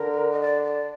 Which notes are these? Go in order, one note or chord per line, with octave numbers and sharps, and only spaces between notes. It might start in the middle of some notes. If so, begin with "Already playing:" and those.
Already playing: D3 A#4
D#5
D5
D5